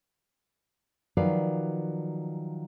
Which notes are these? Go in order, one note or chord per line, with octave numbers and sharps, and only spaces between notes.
D#3 F3 F#3 B4 D5 F5